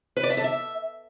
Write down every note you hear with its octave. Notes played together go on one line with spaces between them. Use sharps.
B4
D5
E5
A4
E5